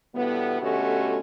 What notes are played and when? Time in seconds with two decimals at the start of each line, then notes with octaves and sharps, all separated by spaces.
0.14 D2 A2 G3 B3
0.61 B2 D3 A3 C#4 F#4 G4